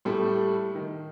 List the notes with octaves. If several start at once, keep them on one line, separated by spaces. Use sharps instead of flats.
A2 G3 A3
D#3